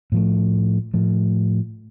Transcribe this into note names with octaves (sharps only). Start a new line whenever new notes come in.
A2 F3 A3
A2 F3 A3